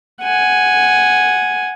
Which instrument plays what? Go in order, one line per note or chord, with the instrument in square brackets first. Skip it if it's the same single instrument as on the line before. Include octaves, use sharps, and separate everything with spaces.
[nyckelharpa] F#5 G#5